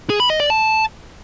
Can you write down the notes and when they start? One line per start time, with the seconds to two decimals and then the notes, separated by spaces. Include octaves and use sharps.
0.10 G#4
0.20 B5
0.30 D#5
0.40 D5
0.50 A5